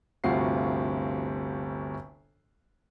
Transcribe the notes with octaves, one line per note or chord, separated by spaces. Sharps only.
G1 D2 C3 F4 F#4 C7